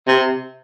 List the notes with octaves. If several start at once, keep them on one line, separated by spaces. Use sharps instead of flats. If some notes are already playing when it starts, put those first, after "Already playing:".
C3